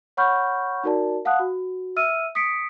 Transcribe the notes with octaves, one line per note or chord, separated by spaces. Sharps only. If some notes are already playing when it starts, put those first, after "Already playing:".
C#5 F#5 B5 C#6 F6 G6
D#4 F#4 A#4 D5 A5
F5 F#5 A5 D#6 F#6
F#4
E5 E6 F6 D#7
D#6 B6 C#7 D7